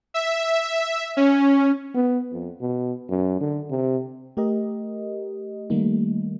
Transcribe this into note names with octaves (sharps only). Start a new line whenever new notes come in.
E5
C#4
B3
F2
B2
F#2
D3
C3
A3 G4 A#4 D#5
D#3 G3 A3 A#3 D#4